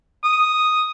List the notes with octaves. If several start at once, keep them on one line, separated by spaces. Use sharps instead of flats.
D#6